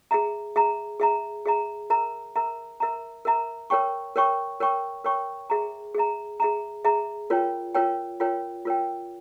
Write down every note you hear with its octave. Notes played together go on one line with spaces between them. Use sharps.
G#4 E5 A#5
G#4 E5 A#5
G#4 E5 A#5
G#4 E5 A#5
A#4 E5 A#5
A#4 E5 A#5
A#4 E5 A#5
A#4 E5 A#5
A#4 C#5 G5 C#6
A#4 C#5 G5 C#6
A#4 C#5 G5 C#6
A#4 C#5 G5 C#6
G#4 E5 A#5
G#4 E5 A#5
G#4 E5 A#5
G#4 E5 A#5
F4 A#4 C#5 G5
F4 A#4 C#5 G5
F4 A#4 C#5 G5
F4 A#4 C#5 G5